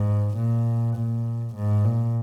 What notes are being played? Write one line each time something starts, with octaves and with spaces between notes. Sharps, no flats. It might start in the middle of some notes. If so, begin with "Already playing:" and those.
Already playing: G#2
A#2
A#2
G#2
A#2